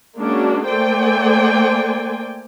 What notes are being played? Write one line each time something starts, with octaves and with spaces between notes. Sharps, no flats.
G#3 A#3 C#4 D4 F#4
A3 A#3 C5 D5 G5 G#5